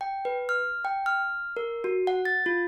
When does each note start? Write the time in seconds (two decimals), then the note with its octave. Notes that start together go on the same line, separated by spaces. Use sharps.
0.01 G5
0.25 B4
0.49 F6
0.85 G5
1.06 F6
1.57 A#4
1.84 F#4
2.07 F#5
2.25 A6
2.46 F4